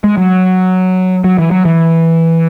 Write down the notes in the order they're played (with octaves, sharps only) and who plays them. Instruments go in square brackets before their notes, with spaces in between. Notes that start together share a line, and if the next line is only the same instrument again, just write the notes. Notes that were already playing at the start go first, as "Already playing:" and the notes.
[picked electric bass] G#3
F#3
F#3
E3
F#3
E3